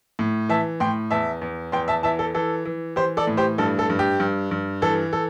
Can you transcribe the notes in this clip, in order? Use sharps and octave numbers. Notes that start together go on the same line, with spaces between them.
A2
E3 E5 A5
A2 G5 C6
E2 E5 A5
E2
E2 G5 C6
E5 A5
E3 E5 A5
A4
E3 A4
E3
E3 G4 C5
A4 D5
A2
G4 C5
G2 A4
A4
G2
G4
G2
G2
E3 A4
A4